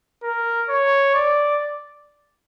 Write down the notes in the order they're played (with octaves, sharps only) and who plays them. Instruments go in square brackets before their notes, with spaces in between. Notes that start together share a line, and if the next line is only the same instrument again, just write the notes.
[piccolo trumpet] A#4
C#5
D5